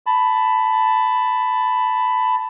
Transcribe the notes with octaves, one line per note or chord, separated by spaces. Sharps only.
A5 B5